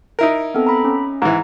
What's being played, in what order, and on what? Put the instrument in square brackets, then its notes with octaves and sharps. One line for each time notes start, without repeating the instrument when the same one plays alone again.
[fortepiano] D#4 E4 A#4
[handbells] B3 C4 A4
A#5 B5
C#4
[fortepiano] G#2 E3 [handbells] A#5